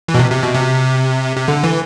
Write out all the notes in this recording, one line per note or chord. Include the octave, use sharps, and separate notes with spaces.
E3
B2
C3
C3
B2
C3
C3
D3
E3